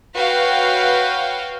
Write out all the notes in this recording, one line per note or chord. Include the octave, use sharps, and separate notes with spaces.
F#4 B4 C#5 F5 G5